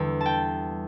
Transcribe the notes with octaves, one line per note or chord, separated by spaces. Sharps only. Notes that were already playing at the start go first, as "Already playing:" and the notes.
Already playing: E2 D3 G3
A5
G5